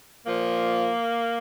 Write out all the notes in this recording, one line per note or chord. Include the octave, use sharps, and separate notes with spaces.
A#2 F3 A#3